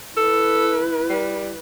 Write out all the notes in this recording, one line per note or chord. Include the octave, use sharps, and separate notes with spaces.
E4 A4 B4
G3